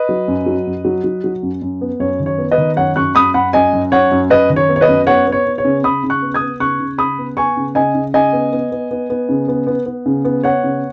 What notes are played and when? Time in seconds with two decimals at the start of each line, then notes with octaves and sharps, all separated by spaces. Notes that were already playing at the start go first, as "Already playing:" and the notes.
Already playing: B4 D#5
0.09 F#3
0.28 F#2
0.46 F#3
0.67 F#2
0.85 F#3
1.04 F#3
1.24 F#3
1.43 F#2
1.62 F#2
1.81 B3
2.00 F#2 C#5
2.20 D#3
2.26 C#5
2.38 B3
2.52 B4 D#5
2.58 D#3
2.76 F#2 C#5 F#5
2.96 F#2 C#6 F#6
3.15 F#2 B5 D#6
3.34 F#2 F#5 B5
3.53 F#2 D#5 G#5
3.73 F#2
3.92 F#2 C#5 F#5
4.12 F#2
4.30 F#2 B4 D#5
4.50 D#3
4.56 C#5
4.69 B3
4.76 C#5
4.81 B4 D#5
4.88 F#2
5.07 B3 C#5 F#5
5.27 B3
5.32 C#5
5.46 B3
5.58 C#5
5.65 C#3
5.84 C#3 B5 D#6
6.03 C#3
6.10 C#6 F#6
6.22 B3
6.34 D#6 G#6
6.41 B3
6.60 C#3 C#6 F#6
6.80 C#3
6.98 C#3 B5 D#6
7.18 B3
7.37 B3 G#5 C#6
7.57 C#3
7.75 C#3 D#5 G#5
7.95 C#3
8.14 C#3 D#5 G#5
8.33 B3
8.52 B3
8.72 B3
8.91 B3
9.10 B3
9.29 C#3
9.48 B3
9.67 B3
9.86 B3
10.06 C#3
10.25 B3
10.43 B3 C#5 F#5
10.64 C#3